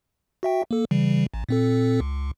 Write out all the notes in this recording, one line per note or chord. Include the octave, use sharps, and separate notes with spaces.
F#4 E5 G5
A#3 A4
C#3 E3 G3
A1
A#2 C4 A4
C#2